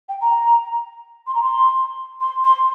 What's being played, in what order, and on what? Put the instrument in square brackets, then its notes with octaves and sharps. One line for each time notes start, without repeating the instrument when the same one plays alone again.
[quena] G5
A#5
C6
A#5
C6
C6
C6